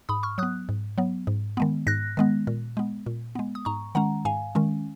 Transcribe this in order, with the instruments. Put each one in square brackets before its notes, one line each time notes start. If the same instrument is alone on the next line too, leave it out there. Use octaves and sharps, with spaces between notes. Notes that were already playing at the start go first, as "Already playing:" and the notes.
[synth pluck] G#2 B5 D#6
C#6 F6
F#3 B3 D#6 F#6
G#2
F#3 B3
G#2
D#3 G#3 B3
G#2 F#6 A#6
D#3 G#3 B3
A#2
G#3 B3
A#2
G#3 B3
D#6
G#2 A#5 C#6
D#3 G#3 C#4 F#5 A#5
G#2 F5 G#5
D#3 G#3 C#4